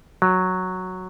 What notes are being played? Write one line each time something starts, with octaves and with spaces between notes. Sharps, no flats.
F#3